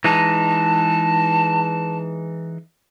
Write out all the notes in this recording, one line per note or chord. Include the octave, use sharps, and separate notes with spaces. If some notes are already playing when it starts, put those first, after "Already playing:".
E3 G#3 D#4 A5